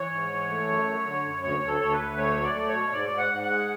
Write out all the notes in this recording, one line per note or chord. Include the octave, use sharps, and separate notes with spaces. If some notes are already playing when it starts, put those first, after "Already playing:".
Already playing: E3 C#5
G#2
E3
A3
F#2
F#3
D3
F#2
D2 C#5
D2
A4
D2 C#5
B4
D2
A3 C#5
F#3
D5
A3
C#5
B2
G#2 D5
G#2
F#5
G#2
F#5
G#3